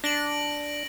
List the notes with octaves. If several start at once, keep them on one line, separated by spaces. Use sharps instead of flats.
D4 A#6 D7 F#7